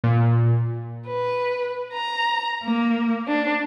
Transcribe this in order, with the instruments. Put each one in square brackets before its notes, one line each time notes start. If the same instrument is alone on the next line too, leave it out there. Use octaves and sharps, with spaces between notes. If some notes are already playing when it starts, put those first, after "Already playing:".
[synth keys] A#2
[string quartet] B4
A#5
A#3
D4